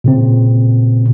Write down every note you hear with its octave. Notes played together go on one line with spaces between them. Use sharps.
A#2 C#3 C4